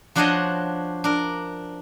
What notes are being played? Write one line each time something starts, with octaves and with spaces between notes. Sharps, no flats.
F3 D4 F#4 C5 C#5 D#5
D4 A#4